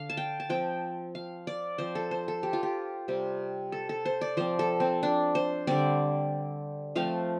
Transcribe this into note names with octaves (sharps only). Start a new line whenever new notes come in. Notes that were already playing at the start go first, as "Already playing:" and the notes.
Already playing: D3 F5
A5
G5
A5
F3 C4 G5
F5
D5
F3 C4 C5
A4
C5
A4
G4
F4
G4
C3 G3 C4
A4
A4
C5
D5
F3 C4 C5
A4
C4
D4
C5
D3 G3 C4 D5
F3 A3 C4 F5